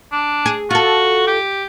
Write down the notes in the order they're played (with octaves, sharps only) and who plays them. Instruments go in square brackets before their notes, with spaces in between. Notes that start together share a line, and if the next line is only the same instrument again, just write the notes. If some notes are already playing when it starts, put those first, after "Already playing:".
[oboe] D4
[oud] G#4
[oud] F4 A4 [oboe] F#4
[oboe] G4